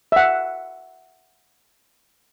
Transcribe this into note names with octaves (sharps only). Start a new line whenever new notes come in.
E5 F#5